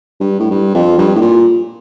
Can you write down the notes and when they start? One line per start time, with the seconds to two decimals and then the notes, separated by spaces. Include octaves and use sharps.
0.20 G2
0.40 A2
0.51 G2
0.75 F2
0.98 G2
1.16 A2
1.21 A#2